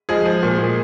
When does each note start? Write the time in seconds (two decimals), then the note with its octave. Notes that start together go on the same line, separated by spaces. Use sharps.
0.09 F3 G#3 G#4
0.26 F3
0.43 A#2
0.58 A#2